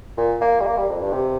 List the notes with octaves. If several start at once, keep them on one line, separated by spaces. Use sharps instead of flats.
A#2
A#3
G3
A#3
G3
F2
G2
C3